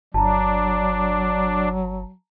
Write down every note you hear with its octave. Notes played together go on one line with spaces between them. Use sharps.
G1 F#3 D4 A5 A#5